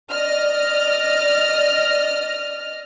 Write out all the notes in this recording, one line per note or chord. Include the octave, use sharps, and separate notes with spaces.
D5 D#5 F6